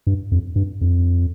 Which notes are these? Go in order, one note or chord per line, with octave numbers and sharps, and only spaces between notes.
G2
F2
G2
F2